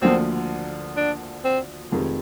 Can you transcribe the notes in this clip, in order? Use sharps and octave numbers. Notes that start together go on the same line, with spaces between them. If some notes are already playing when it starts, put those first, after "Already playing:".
D2 D3 F3 A#3 C4
D4
C4
F1 F2 C3 D#3 G#3